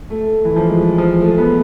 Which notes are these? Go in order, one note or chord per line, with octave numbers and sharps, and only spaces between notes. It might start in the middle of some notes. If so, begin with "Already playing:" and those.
A3
E3
F3
G#3
F3
A3
G#3
B3
A3